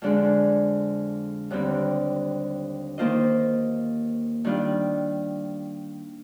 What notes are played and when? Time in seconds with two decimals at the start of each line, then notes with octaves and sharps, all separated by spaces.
0.02 F2 D3 G#3 D4 G#4
1.50 D#2 D3 G3 C4
2.98 D#3 A#3 F4 C5 D#5
4.45 D#3 G3 D4 F4